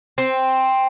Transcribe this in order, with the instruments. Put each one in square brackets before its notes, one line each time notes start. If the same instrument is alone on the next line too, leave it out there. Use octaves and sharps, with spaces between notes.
[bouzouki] C4